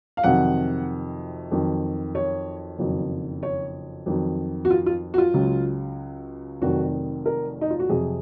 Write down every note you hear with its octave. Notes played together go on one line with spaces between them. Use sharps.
F5
F2 C3 D#3 F#3 F#5
F2 D#3 F#3
C#5
F#1 F2 D#3 F#3
C#5
F2 D#3 F#3
F#4
F4
F4
F#4
F4
C#2 C#3 F#3
F1 F2 D#3 F#3 F#4
A#4
D#4
F4
F#4
F2 C3 F#3 G#4